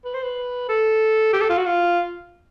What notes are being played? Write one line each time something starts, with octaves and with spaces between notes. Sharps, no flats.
B4
C5
B4
A4
G4
A4
F4
F#4
F4